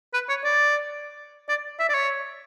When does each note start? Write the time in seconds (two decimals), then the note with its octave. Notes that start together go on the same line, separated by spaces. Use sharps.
0.14 B4
0.29 C#5
0.44 D5
1.49 D5
1.79 E5
1.89 D5
1.94 C#5